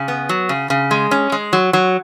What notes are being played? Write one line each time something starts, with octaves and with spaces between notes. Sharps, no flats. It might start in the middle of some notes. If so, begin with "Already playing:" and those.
Already playing: C#3
B3
F#3
C#3
C#3
G#3
C#4
G#3
F#3
F#3